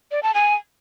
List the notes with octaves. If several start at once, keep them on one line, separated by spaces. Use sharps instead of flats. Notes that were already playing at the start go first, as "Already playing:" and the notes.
D5
A5
G#5